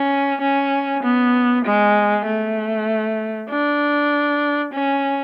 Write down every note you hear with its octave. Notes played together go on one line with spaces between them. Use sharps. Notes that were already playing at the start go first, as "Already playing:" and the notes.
Already playing: C#4
C#4
B3
G#3
A3
D4
C#4